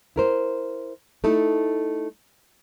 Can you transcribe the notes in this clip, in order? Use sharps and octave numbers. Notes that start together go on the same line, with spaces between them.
E4 A#4 C5
A3 D#4 E4 A4